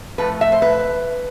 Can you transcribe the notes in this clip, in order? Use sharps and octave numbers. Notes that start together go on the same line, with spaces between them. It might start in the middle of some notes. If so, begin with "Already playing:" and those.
A2 F3 A3 B4
E5
C5
B4